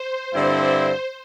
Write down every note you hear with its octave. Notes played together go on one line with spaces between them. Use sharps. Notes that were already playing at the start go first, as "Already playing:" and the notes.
Already playing: C5
G2 D3 C4 E4 C5